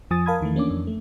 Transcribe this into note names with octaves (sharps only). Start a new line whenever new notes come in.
F2 F3 G#5 D#6 A6
A#4 F5 A5 B5 D#6 G#6
E2 D#3 E3 A3
E3 A#3 C#4 D4 D6
F2
A3